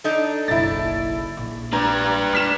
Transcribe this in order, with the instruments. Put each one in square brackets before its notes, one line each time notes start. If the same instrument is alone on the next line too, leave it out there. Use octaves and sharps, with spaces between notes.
[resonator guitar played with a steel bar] D4 D#4 A4
[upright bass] F#1 B1 [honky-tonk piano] E4 A6
[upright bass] A#1
[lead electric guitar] D4 B4 [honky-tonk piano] A#5
[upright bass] A3 [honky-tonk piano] F6 B6 E7